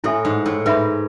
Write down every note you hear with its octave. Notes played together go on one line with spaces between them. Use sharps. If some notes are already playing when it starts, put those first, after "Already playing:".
A2 E4 A4 E5 G#5
G#2
A2
G#2 B4 E5 B5